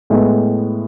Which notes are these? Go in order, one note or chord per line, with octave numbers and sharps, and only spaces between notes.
A2 G#3 B3